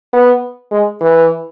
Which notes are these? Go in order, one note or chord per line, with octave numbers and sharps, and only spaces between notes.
B3
G#3
E3